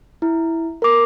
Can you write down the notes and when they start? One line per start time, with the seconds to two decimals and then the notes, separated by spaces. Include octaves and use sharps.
0.22 E4
0.82 A#4 D6